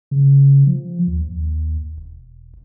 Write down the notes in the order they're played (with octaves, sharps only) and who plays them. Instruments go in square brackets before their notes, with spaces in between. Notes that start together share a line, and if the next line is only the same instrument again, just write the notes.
[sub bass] C#3
F3
D#2
D#2
E1